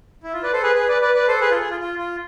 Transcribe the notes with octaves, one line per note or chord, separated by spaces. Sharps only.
E4
F4
B4 D5
A4 C5
G#4 B4
G#4 B4
B4 D5
B4 D5
B4 D5
A4 C5
G#4 B4
F4 A4
G#4
F4
F4
F4